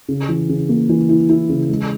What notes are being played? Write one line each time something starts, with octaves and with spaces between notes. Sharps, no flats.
C#3
E3
C#3
A#3
E3
E4
E4
C#3
G#3